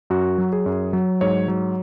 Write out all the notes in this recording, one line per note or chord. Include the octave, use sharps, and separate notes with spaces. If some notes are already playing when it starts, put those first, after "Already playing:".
F#2 F#4
F#3
G#4
F#2
F#3
G#2 C#5
F#3